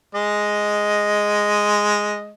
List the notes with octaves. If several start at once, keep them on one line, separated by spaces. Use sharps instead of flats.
G#3 D#5